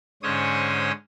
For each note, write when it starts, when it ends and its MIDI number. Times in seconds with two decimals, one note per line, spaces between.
0.23 0.92 44
0.23 0.92 50
0.23 0.92 61
0.23 0.92 72
0.23 0.92 73
0.23 0.92 87